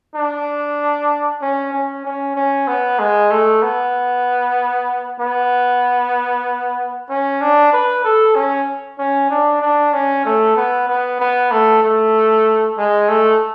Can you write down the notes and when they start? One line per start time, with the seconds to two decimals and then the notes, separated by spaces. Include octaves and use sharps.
0.16 D4
1.42 C#4
1.73 C#4
2.05 C#4
2.36 C#4
2.68 B3
2.99 G#3
3.31 A3
3.63 B3
5.20 B3
7.10 C#4
7.41 D4
7.73 B4
8.04 A4
8.36 C#4
8.99 C#4
9.31 D4
9.62 D4
9.93 C#4
10.25 A3
10.57 B3
10.88 B3
11.20 B3
11.51 A3
11.83 A3
12.78 G#3
13.09 A3